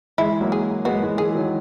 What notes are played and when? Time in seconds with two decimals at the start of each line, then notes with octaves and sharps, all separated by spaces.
0.18 E3 G#3 E4
0.41 F#3 A#3
0.52 G#4
0.85 G#3 B3 F#4
1.02 E3 G#3
1.18 E3 G#3 G#4
1.35 D#3 F#3